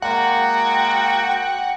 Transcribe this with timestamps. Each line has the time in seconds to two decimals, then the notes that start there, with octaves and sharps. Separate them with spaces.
0.02 G#3 A#3 F#4 F#5 G5